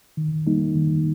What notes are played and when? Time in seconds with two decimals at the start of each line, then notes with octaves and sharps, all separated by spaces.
0.17 D#3
0.47 G3 A#3 D#4
0.75 D#3